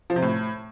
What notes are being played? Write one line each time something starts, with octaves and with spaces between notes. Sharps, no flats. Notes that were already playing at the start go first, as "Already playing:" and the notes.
F3
C3
A2